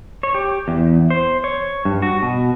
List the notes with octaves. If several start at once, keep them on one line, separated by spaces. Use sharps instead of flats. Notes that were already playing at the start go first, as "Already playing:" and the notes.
C#5
G4
E2
C5
C#5
G2
F#4
B2